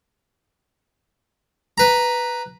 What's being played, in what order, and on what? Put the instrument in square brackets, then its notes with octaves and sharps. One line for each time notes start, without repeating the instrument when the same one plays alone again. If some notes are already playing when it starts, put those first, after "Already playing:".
[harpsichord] B4 A#5